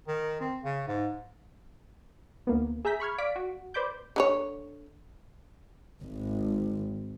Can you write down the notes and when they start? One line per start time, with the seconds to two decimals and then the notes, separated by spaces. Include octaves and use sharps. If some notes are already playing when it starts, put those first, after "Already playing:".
0.08 D#3
0.40 C4
0.64 C#3
0.88 G#2
2.47 D2 A#3 B3
2.85 G#4 E5 G#5 A#5 G6 B6
3.00 B5 C#6 F6 G#6
3.18 D5 F5 B6 D7
3.36 F#4
3.74 B4 C5 D5 B5 D6 G6
4.16 D3 D#4 C#5
6.00 G#1